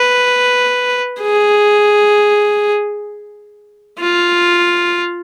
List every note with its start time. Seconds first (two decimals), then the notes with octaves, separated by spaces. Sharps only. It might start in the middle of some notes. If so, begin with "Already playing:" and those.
Already playing: B4
1.21 G#4
4.00 F4